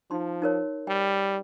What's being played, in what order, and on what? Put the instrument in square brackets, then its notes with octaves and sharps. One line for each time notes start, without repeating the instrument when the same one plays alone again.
[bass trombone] F3 [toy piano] D#4 C6
[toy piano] D#4 A#4 C#5
[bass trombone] G3 [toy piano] G5